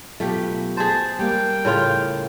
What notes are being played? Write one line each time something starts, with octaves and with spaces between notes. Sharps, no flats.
B2 F#3 A3 F4 G4
G#4 C5 A5
G3 A#3 G5
A2 C#3 F4